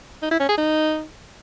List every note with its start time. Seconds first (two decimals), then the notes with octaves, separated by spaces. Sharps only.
0.22 D#4
0.31 E4
0.40 C#4
0.49 G#4
0.58 D#4